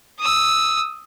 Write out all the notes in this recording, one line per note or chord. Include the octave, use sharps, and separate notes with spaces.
D#6 E6